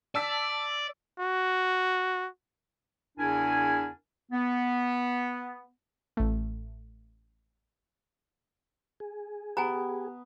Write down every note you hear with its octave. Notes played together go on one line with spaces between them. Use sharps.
D5 A5 E6 B6
F#4
E2 C#3 D4 E4 A#4 G#5
B3
A1 A3
G#4
B3 G4 G#5 A#5